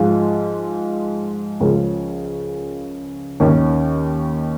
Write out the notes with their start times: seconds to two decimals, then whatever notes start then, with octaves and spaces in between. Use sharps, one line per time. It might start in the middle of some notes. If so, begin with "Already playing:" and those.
Already playing: G#2 F3 G#3 F4
1.60 C#2 C#3 F3 C#4 A#4
3.40 D#2 D#3 C#4